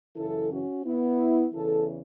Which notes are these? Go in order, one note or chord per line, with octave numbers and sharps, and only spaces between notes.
F#2 C#3 E3 E4 A4
C#4 F#4
B3 E4
E2 C#3 E3 E4 A4